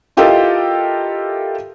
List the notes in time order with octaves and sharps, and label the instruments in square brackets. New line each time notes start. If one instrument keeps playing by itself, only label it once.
[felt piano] E4 F4 G4 A4 A#4 D#5